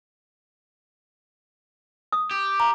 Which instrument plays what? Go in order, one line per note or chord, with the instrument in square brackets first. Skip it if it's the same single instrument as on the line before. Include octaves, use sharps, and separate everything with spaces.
[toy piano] D#6
[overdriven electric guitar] G4
[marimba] A#5